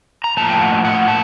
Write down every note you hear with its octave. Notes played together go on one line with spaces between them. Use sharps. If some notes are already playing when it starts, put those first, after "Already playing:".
A#5
A2 F3 A#3 A5
G5
F#5
F#5
A#3 A5